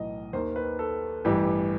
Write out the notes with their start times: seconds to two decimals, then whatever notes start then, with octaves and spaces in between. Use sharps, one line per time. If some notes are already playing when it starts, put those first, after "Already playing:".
Already playing: B1 A2 E3 D#5
0.33 D#2 D#3 C5
0.56 B4
0.79 A4
1.25 A1 G2 E3 G4